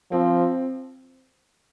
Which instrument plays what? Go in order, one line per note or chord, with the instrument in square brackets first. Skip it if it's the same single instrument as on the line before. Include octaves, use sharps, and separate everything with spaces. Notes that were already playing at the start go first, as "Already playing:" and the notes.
[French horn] F3 [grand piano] C4